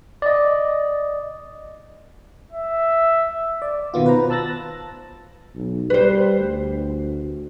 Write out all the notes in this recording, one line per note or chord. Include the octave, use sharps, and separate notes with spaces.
D5 D#5
E5
D5
B2 D#3 B3 F4
B4 C5 A#5
A5 E6 F#6 A6 A#6
B1
G3 B4 C5
D2